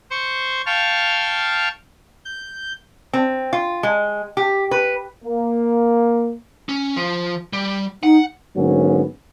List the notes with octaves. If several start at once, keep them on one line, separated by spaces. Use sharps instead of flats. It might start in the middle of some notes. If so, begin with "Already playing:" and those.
C5 C#6
F5 G5 A5 C#6 F6
G6
C4
F4
G#3
G4
B4
A#3
C#4
F3
G3
D#4 F#5
G#2 D3 F#3 A#3 B3 C#4